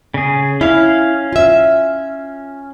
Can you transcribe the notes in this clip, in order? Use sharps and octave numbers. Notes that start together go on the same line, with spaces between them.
C#3 G#4
C#4 E4 F5
F4 E5